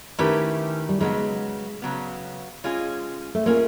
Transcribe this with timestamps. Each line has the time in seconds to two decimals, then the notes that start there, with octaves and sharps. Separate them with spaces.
0.19 D#3 A3 C#4 E4 G4 B4
0.89 G3
1.00 C#3 F#3 G#3 B3
1.82 C#3 F#3 B3
2.64 G#3 C#4 F4 G#4
3.35 A3
3.46 G#3 A#3 C#4 F4 G#4